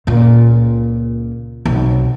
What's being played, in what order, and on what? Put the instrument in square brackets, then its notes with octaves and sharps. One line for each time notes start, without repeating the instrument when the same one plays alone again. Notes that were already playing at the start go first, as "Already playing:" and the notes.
[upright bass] C#2 A#2
B1 C3